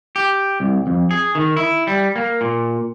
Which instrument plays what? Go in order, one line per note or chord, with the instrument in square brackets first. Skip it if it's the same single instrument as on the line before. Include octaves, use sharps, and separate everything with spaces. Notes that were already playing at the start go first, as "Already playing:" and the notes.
[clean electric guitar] G4
C2
F2
G#4
D#3
E4
G3
A#3
A#2